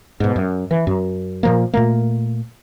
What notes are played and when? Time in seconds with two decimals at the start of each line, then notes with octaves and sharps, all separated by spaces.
0.20 G#2 B2
0.36 F#2
0.71 E3
0.87 F#2
1.43 A#2 F3 A#3
1.74 A#2 A3 A#3